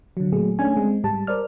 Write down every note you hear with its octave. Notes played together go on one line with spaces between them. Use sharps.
D3 F#3
A#2 F#3 A3 G#4
A3 C#4 D4 G#5
G#3 C4
G#2 G3 A5
A#4 C5 D5 F6